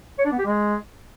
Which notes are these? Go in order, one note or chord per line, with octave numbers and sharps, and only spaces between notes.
C#5
D4
B3
G4
G#3